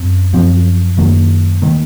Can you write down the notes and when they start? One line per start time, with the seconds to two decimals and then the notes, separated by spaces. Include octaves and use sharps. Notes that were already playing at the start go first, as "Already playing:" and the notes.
Already playing: F#2 C4
0.33 F#2 F3 C4
0.97 F#2 D#3 A#3
1.62 D#3 A#3